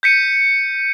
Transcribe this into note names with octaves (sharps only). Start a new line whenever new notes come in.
G6 B6 C#7 D#7